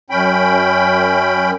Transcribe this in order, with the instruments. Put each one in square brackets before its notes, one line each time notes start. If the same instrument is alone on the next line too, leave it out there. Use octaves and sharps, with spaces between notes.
[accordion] F#2 C#4 G5 B5